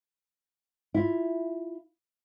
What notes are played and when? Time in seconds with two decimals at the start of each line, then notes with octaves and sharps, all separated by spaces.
0.94 E4 F4